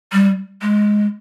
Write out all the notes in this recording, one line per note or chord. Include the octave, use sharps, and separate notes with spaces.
G3
G#3